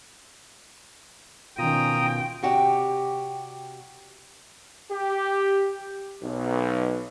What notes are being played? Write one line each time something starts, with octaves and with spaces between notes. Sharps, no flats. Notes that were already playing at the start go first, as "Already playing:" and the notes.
B2 D#3 C#4 F4 G5 A#5 D#6
C3 F#4 G4 D5
G4
B1